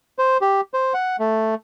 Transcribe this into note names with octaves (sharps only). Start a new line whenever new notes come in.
C5
G4
C5
F#5
A3